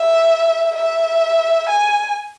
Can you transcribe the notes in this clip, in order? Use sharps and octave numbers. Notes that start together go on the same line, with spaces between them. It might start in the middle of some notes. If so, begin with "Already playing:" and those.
Already playing: E5
E5
G#5